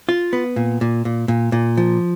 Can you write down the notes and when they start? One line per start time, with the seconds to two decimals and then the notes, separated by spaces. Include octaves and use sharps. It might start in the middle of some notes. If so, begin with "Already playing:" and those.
0.09 F4
0.33 B3
0.56 A#2
0.81 A#2
1.05 A#2
1.28 A#2
1.52 A#2
1.77 F3